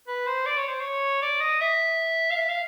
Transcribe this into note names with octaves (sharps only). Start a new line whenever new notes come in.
B4
C5
D5
C#5
C5
C#5
D5
D#5
E5
F5
E5
F5